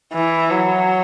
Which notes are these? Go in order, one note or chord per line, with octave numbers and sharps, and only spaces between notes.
E3
F#3